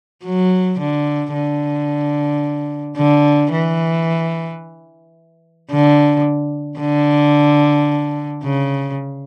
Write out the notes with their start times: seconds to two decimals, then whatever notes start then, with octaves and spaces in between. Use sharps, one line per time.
0.25 F#3
0.79 D3
1.34 D3
2.97 D3
3.52 E3
5.71 D3
6.79 D3
8.43 C#3